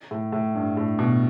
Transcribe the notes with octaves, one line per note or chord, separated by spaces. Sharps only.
A2
A2
G2
A2
B2